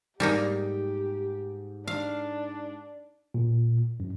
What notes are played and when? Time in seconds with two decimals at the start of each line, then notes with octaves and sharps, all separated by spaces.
0.20 G#2 G3 A#3 D#4 G4
1.88 D4 F5
3.34 A#2
4.00 F#2